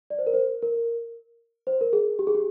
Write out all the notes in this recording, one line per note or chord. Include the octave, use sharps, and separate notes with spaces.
D5
C5
A#4
C5
A#4
C5
A#4
G#4
G4
G#4
G4